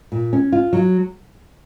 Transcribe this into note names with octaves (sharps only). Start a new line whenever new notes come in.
A#2
C#4
F4
F#3